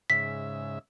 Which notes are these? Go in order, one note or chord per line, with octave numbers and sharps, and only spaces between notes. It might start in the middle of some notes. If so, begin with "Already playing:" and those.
G#2 C#3 E5 B6